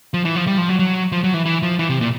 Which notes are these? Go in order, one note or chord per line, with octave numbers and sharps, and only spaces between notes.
F3
E3
F3
G3
F3
F#3
F#3
F3
F#3
E3
E3
F3
E3
C3
A#2